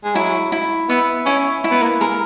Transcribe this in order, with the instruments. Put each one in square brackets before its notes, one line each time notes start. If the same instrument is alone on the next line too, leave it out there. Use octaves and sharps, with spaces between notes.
[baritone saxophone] G#3
[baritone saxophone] F#3 [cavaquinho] E4
[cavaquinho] E4
[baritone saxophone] B3 [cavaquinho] E5
[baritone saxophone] C#4 [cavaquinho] E4
[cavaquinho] E4
[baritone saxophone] B3
A#3
[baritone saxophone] G#3 [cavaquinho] A#4